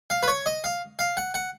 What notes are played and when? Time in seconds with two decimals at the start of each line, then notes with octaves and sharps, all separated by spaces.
0.10 F5
0.23 B4
0.28 C#5
0.46 D#5
0.64 F5
0.99 F5
1.17 F#5
1.34 F#5